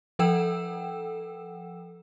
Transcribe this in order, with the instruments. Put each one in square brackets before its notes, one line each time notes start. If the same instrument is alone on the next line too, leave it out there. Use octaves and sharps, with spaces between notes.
[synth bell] F3 A4 F#5 G5 E6 E7